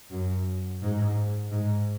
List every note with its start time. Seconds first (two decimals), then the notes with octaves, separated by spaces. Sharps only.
0.11 F#2
0.82 G#2
1.52 G#2